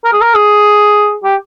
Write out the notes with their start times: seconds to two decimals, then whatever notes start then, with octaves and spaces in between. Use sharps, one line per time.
0.05 A#4
0.13 G#4
0.21 A#4
0.34 G#4
1.24 G4